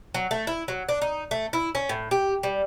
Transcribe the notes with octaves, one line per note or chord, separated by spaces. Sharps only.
F#3
A3
E4
F#3
D4
D#4
A3
E4
C#4
A2
G4
G3